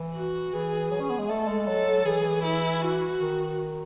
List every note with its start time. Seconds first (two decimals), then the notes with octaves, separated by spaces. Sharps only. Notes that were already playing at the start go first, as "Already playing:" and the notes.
Already playing: E3
0.14 F#4
0.52 E3 G#4
0.91 F#3
1.00 C#4
1.10 B3
1.19 G#3
1.29 A3 A4
1.48 G#3
1.67 F#3 A4
2.05 E3 G#4
2.43 E4
2.82 F#4
3.20 D#3